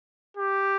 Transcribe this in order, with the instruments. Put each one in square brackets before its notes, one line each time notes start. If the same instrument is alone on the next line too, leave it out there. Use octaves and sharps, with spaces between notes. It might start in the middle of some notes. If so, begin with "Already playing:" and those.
[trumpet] G4